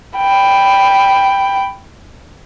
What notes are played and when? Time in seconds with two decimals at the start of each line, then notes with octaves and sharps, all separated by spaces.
0.17 G5 B5